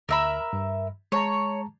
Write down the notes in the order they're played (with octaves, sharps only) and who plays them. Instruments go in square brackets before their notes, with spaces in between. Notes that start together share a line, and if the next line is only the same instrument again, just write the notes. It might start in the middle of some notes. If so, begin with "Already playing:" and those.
[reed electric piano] D2 A#5 [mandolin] A#4 E5 B5
[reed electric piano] G2
[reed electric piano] G#3 A5 A#5 [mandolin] C#5